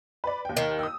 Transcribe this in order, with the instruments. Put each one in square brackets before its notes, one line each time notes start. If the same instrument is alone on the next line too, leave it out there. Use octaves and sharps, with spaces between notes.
[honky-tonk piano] B4 D5
D#2 G5
[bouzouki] D#3
[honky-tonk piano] D#6 E6